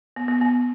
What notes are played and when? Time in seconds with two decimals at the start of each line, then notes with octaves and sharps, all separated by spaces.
0.16 B3
0.28 B3
0.41 B3